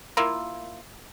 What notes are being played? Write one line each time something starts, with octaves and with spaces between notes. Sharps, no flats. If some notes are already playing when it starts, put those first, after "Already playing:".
A#3 E4 F4